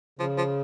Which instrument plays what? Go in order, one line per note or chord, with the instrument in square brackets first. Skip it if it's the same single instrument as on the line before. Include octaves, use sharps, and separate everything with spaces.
[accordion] C#3 [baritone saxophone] F3
[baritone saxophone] F3